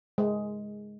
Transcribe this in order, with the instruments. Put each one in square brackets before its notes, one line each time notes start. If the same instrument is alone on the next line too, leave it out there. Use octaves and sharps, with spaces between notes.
[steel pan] G#3